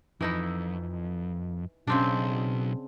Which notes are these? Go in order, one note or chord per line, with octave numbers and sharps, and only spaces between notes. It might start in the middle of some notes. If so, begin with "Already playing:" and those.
F2 E3 D#4 E4
B1 C#3 C4 D4